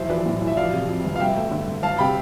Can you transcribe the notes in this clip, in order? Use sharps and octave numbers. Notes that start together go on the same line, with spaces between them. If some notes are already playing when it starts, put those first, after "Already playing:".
Already playing: B1 E2 C5 E5
F3 B4 D5
A2
B1
E5
F3 D5 F5
C3
F2
G1
F5
G2 E5 G5
A3
D3
G2
G1 F5 A5
C3 G5 B5